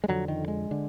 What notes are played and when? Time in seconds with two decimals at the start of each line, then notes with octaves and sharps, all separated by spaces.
0.04 G#3
0.08 F2 D3 F#3
0.28 D#3
0.48 G#3
0.71 D3